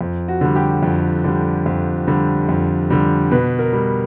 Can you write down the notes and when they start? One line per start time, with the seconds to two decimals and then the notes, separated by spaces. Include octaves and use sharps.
0.01 F2
0.28 F#4
0.41 D3 G3
0.56 G4
0.83 F2
1.24 D3 G3
1.66 F2
2.07 D3 G3
2.49 F2
2.90 D3 G3
3.31 B2 B4
3.59 A#4
3.73 G3